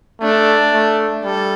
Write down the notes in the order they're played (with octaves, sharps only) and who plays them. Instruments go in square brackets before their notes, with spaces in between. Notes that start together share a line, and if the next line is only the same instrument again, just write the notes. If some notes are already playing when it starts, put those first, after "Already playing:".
[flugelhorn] A3 [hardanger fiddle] D4
[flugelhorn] A3
[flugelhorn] G3 [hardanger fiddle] A4